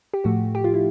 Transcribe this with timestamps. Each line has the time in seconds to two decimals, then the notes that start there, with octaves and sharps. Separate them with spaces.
0.14 G4
0.24 A2 F3 A3 F#4
0.55 G4
0.64 F4
0.74 E4